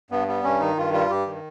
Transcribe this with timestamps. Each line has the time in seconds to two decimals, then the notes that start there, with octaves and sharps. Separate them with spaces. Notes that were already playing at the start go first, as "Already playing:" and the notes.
0.11 G2 B3
0.28 G3 B3
0.44 G2 C#4
0.60 D#3 D#4
0.77 G2 F4
0.93 G3 F4
1.10 G2 G4
1.27 D#3